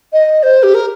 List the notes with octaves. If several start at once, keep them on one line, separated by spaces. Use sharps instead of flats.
D#5
C5
G4
A#4